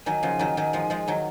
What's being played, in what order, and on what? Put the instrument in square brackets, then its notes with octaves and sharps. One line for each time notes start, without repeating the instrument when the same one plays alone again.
[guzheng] D#3 F#3 [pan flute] G#5
[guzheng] C#3 F3
D#3 F#3
D#3 F#3
F3 G#3
F3 G#3
D#3 F#3